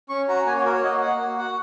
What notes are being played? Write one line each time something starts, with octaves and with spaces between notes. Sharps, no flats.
C#4 C#6
F#4 A#5
A#3 G#5
C#5
F#4 A#4
C#5
A#3 D#5
F#4 F#5
A#3
F#4 F#5